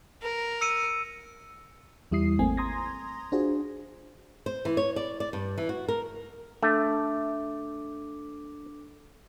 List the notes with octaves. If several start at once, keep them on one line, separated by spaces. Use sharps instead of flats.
A#4
E6 C#7 D#7
E2 G3 E4 D#6 C7
G#1 A3 A#3 C4 G#5
A#5 C6 D#6 G#6 A#6
D4 F4 F#4 G#4 C5
C5
E3
C#5
D5
D5
G2
E3
F#4
A#4
A3 D4 D6